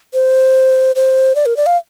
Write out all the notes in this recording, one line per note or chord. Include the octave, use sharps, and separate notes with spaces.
C5
C5
D5
A#4
D5
F5